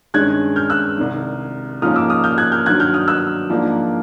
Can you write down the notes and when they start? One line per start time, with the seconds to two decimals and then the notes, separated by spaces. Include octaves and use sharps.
0.14 G2 D#3 G#3 C#4 F#6 G#6
0.56 F6 G6
0.70 E6 F#6
0.98 C2 C3 D#3
1.82 G#2 F3 A#3 C#4 D#6 F6
1.96 D6 E6
2.10 D#6 F6
2.24 F6 G6
2.38 F#6 G#6
2.52 F6 G6
2.66 G2 D#3 F#3 F#6 G#6
2.80 F6 G6
2.94 D#6 F6
3.08 E6 F#6
3.50 G#2 F3 A#3 D4